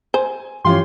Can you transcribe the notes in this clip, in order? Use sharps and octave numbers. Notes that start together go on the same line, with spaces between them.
C5 G#5
G2 E3 F3 C#4 F4 G4 C6